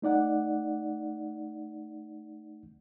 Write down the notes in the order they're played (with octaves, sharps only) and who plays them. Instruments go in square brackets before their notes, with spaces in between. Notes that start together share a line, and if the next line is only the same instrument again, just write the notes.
[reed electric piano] A3 D#4 D5 F#5